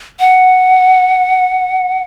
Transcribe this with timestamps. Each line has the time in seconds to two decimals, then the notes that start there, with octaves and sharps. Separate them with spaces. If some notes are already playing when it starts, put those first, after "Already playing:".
0.20 F#5